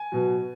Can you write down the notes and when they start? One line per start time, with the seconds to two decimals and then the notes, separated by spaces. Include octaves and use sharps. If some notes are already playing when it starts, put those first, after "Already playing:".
Already playing: G#5
0.12 B2 F#3